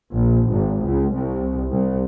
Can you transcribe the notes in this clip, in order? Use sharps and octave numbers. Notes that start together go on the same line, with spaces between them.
A#1
G#1
C#2
C2
C2